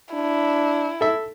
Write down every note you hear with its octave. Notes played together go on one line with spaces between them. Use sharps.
D4 E4
A4 E5